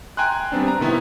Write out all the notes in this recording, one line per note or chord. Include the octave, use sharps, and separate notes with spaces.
G5 G#5 A#5 C6 F#6
G3 B3 C4 D4
A#5
C3 D#3 B3 E4